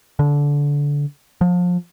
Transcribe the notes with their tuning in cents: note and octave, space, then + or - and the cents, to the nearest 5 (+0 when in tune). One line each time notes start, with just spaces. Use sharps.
D3 -20
F3 +30